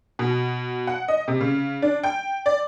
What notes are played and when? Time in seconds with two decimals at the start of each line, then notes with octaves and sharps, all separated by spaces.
0.19 B2
0.87 F#5
1.08 D#5
1.28 C3
1.41 C#3
1.82 D4
2.03 G5
2.46 D5